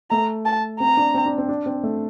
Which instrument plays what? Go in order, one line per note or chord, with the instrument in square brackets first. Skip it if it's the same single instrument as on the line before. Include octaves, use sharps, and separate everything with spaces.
[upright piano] A3 [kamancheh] A#5
[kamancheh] A5
[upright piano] C4 [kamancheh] A#5
[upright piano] D4
C4
D4
C4
D4
C4
A3